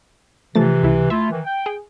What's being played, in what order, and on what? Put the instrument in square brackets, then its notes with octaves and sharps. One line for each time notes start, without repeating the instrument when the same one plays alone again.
[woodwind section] C3 E3 [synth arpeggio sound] F3 A3 A6
[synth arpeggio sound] C#2 E4
[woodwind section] A3 E4 F4 [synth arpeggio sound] E5
[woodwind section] D#3 E3
G5
[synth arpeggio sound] G#4